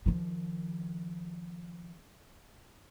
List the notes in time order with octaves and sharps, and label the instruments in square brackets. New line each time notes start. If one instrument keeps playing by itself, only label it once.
[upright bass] D#3 F3